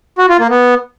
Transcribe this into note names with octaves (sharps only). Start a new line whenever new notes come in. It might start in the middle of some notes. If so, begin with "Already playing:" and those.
F#4
F4
A#3
B3